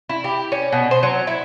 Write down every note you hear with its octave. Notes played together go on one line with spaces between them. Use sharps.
E4
G4
C#4
B2
C5
F#3
E4